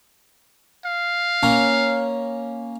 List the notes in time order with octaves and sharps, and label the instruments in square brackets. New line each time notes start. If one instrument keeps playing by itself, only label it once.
[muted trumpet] F5
[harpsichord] A#3 C#4